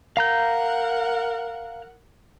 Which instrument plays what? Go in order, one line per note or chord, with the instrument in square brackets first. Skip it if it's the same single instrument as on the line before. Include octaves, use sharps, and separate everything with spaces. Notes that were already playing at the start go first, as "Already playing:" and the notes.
[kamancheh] A#4 F#5 [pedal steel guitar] F5 A#5 G6